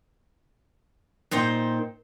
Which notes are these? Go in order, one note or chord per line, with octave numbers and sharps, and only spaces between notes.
A#2 D#4 C5 G5